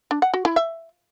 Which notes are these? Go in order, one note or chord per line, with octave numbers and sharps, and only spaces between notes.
D4
F#5
F#4
E4
E5